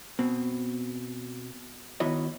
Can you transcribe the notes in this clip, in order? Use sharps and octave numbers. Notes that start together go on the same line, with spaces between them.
B2 C4
D#3 B3 E4 F#4 C#5 D#5